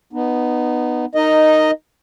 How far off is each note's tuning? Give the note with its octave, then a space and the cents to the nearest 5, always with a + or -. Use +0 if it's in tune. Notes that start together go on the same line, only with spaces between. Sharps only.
B3 +0 D#4 -25
D#4 -5 A#4 -20 D#5 +0